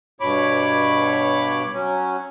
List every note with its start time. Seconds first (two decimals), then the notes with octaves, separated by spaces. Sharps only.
0.21 G2 B2 C#5 B5 D6
1.74 F#3 C#4